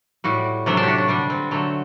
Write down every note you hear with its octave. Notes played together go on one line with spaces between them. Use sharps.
A2 G3 F#4
C3 F#3 A3 D4
D4
F#4 G4
F#4
D3 G3 D4
C4
D3 F#3 A3